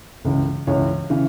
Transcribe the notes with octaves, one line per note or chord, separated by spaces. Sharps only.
C#2 C#3 E3
C#2 C#3 E3 C#5
C#3 E3